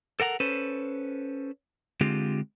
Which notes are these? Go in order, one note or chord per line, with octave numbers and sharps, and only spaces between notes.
A4 A#4 F#5 A#5
C#4 A4 B4 C5
D3 G#3 C4 F4 G4